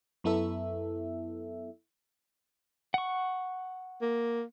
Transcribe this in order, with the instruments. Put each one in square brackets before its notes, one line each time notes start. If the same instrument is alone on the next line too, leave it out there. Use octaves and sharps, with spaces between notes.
[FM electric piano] F#2 B3 E4 A4 E5
[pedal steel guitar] F#5 C#6
[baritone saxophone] A#3